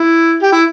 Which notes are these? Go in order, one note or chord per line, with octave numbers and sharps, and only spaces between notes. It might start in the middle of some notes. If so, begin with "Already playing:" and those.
Already playing: E4
G4
E4